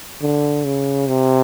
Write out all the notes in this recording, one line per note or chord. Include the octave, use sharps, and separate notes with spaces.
D3
C#3
C3